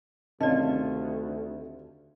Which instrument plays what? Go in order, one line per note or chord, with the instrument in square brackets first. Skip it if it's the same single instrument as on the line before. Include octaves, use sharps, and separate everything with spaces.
[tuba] D2 [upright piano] C3 D#3 A5 [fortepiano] C#4 F4 [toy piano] D5 D#5